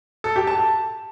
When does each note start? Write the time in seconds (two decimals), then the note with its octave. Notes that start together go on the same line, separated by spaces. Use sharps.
0.24 A4
0.36 G4
0.47 A5